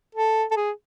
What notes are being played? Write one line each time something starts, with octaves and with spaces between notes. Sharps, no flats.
A4
A4
G#4